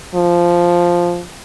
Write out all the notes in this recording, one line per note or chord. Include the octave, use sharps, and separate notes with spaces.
F3